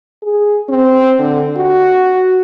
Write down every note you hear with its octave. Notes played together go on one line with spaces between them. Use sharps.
G#4
C4
D3
F#4